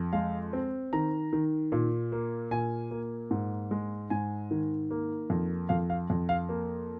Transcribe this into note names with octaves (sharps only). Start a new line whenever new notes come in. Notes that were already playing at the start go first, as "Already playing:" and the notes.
Already playing: F2
G#3 F5
C4
D#3 A#5
D#3
A#2
A#3
A#2 G#5
A#3
G#2
G#3
G#2 G#5
D#3
A#3
F2
F2 F5
F5
F2
F5
A#3